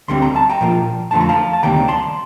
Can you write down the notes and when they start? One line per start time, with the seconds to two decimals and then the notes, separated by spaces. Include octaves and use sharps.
0.08 D2 D3 G3 C4 C6
0.22 A#5
0.36 A5
0.50 G5 A#5
0.61 A#2 F3 A#3 F4
1.11 F2 D3 F3 A3 A5
1.21 A#5
1.29 F5 A5
1.53 A5
1.63 D2 C3 D#3 G3 A#3 G5 A#5
1.88 A5 C6